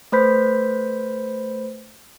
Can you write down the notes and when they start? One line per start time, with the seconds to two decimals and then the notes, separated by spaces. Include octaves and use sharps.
0.12 A3 B4 C5 B5 G6 B6